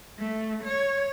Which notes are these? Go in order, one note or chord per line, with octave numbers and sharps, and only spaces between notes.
A3
C#5